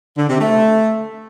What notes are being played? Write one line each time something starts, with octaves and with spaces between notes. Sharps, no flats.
D3
C3
A3